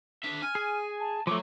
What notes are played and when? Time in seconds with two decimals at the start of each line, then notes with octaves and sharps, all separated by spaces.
0.24 D4 E5
0.42 G#5 F6
0.55 G#4
1.00 A5
1.27 F3 F#3 A3 D6